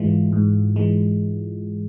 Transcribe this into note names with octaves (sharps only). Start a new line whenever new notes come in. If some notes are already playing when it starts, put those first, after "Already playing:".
Already playing: G#2 E3 G#3 F4
G#2
E3 G#3